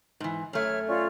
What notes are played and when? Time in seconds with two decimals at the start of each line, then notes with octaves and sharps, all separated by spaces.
0.20 G#2 E3
0.53 F#2 A3 C#5 F6
0.87 C#4 F4 D5